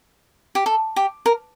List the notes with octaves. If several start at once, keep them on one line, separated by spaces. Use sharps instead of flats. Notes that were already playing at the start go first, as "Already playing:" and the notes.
G4
A4
G4
A#4